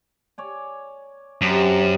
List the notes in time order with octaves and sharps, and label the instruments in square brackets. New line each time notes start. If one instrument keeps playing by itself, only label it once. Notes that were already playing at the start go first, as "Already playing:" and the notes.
[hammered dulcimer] C#5 D5 G#5
[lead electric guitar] F#2 [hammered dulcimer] C3 D4